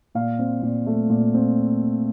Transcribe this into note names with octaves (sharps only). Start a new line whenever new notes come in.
A#2 F5
C4
A#2
A3
A#2
C4